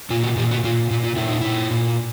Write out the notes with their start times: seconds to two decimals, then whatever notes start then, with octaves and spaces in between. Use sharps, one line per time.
0.10 A#2 F4
0.23 F#4
0.37 A#2 G4
0.51 F#4
0.64 A#2 F4
0.90 A#2 F4
1.04 F4
1.16 A#2 E4
1.29 D#4
1.41 A#2 E4
1.71 A#2